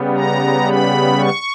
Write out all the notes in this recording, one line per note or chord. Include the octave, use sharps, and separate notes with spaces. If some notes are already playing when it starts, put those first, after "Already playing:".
Already playing: C#3 G3 B3
A#5
B5
C#6